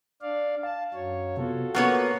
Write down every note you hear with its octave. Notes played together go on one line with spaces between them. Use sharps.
D4 D5 F5
F5 A5
F#2 F#3 C#5
C3 B3 F4 F#4 A4
A#3 B3 C#5 F#5 C#6 F#6